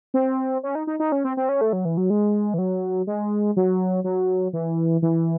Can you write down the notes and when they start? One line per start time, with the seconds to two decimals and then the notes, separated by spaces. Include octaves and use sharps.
0.14 C4
0.63 C#4
0.75 D#4
0.87 D#4
1.00 D#4
1.12 C#4
1.24 C4
1.37 C4
1.49 C#4
1.61 A3
1.73 F#3
1.85 E3
1.97 F#3
2.10 G#3
2.54 E3
2.58 F#3
3.07 G#3
3.57 F#3
4.04 F#3
4.53 E3
5.02 E3